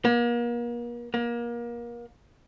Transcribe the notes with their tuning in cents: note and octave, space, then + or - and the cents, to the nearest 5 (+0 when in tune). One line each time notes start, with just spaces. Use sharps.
A#3 +40
A#3 +30